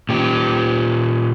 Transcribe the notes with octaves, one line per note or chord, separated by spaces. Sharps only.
A#2 G4